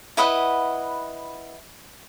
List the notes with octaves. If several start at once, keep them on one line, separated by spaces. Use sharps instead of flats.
E4 B4 D#5 F#5